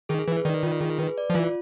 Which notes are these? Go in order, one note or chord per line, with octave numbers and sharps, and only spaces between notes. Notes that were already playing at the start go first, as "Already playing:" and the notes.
D#3 G#4
E3 B4
D#3 D5
F4
G#4
B4
D5
F3
E3 F4